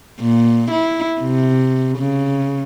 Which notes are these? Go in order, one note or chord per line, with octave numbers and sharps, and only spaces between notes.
A#2
E4
C3
C#3